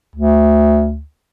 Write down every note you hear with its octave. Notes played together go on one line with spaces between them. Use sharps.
D2